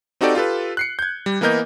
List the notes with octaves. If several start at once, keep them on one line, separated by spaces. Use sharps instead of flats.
C4 D#4 F#4 G4 A4 D5
F4 G4 A4 B4
F#6 C7 C#7
G6 G#6
G3
E3 A#3 B3 A#4 D#5 G6